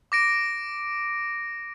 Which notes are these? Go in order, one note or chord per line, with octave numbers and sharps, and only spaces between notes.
D6 A#6 D7